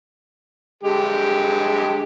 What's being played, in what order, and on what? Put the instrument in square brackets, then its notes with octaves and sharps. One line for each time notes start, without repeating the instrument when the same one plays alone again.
[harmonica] D3 G#3 G4